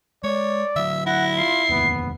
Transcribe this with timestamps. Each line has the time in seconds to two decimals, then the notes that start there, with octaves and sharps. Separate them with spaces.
0.24 G#3 C#5 D5
0.76 D3 F#3 E5
1.06 E4 F#5 A#6
1.37 F4 C7
1.69 F1 D#2 G#2 B3